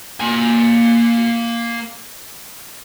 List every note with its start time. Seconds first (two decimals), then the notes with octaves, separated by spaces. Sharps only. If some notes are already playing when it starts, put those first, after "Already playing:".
0.20 A#3 G#5